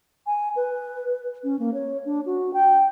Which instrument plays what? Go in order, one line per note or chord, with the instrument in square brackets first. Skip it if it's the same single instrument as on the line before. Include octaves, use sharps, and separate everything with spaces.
[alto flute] G#5
B4
C#4
A#3
C#5
D4
F#4
G5